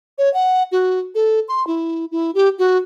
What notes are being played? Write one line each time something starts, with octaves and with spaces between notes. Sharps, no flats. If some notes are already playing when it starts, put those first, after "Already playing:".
C#5
F#5
F#4
A4
C6
E4
E4
G4
F#4